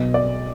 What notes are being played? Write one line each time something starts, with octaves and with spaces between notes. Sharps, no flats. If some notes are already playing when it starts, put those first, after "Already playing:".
Already playing: B1 B2 F#3 D#5
D5